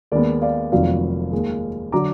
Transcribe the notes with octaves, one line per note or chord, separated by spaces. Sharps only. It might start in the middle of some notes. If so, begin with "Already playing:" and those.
D#2 D#3 G#3 B3 A#4 D5
D5 F5
F1 F2 D#3 F#3 A#3 D5 F5
D#2 D#3 G#3
D3 F#3 A#5 D6